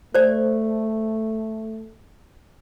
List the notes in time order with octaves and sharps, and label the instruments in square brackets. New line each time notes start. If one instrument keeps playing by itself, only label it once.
[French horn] A3 [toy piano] C5 D5